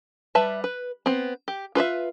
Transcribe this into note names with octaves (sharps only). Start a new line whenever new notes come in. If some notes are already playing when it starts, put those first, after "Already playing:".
G3 B4 E5 A5
B4
B3 C4
G4
F4 B4 C5 E5